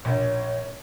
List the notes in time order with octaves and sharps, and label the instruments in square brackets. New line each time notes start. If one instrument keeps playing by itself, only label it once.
[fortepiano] A#1 [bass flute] C#5